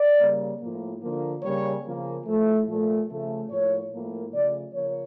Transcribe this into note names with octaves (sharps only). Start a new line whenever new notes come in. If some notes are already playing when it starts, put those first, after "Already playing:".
Already playing: D5
C#3 G3 A#3
A2 F3 A#3
D3 F3 A#3
C#3 G3 A#3 C#5
C#3 F3 A#3
A2 F3 A3
A#2 F3 A3
C#3 F3 A3
A2 F3 A#3 C#5
A2 F3 A#3
C#3 F3 A3 D5
C#3 F3 A#3 C#5